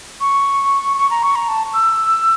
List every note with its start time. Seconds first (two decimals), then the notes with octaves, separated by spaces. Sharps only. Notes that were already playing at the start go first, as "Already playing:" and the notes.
0.21 C#6
0.97 C#6
1.10 A#5
1.23 C#6
1.36 A#5
1.48 A5
1.74 E6